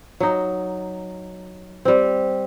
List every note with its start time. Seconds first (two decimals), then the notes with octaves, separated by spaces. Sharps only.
0.20 F#3 D#4
1.85 G3 C4